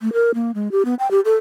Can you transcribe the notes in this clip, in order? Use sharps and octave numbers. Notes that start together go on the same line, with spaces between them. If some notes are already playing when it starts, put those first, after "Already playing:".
A3
A#4
A#3
G#3
G4
B3
G5
G4
A4